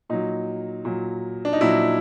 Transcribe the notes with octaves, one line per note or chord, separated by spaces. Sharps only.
A#2 F#3 D#4
A#2 F#3
D4
D#4
A#2 F#3 E4